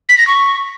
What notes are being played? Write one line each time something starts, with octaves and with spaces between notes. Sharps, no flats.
B6
A#6
C#6